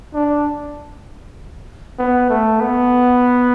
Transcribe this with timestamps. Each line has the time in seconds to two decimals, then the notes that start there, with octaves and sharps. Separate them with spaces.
0.14 D4
1.99 B3
2.30 A3
2.60 B3